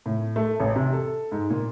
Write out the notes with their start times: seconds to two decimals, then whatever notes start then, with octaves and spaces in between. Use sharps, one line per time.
0.06 A2
0.36 A3
0.60 A1
0.76 C3
0.93 A4
1.32 G#2
1.50 A#2